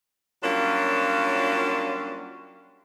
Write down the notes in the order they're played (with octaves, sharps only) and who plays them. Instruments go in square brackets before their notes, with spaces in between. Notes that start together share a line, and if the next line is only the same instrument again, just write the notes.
[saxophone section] F#3 G3 A#3 C#4 D4 F4